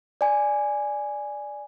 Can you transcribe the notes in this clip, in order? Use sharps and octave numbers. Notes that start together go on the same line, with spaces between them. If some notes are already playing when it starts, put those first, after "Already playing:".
D5 G#5